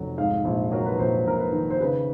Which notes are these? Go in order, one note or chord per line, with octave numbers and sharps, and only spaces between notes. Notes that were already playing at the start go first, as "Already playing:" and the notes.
Already playing: F1 F#3
G#2 F5
A#1
F#3 A#4
B4
A#1 C5
A#1 A#4
B4
D#3
C5
C#3 B4